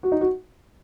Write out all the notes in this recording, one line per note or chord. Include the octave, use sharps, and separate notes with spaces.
F#4
D#4
F#4